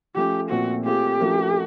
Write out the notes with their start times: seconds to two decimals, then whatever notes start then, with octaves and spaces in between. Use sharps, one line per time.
0.15 F3 A3 C#4 G4
0.50 A#2 F3 A3 C4 F#4
0.85 A3 C4 F4 G4 G#4
1.20 F3 A3 C#4 F#4 A#4